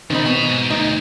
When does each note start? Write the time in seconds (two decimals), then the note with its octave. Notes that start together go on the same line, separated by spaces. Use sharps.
0.10 C3 D#3 C4 D#4 B5
0.26 B2 G#5 B5
0.49 G#2
0.71 D2 D#4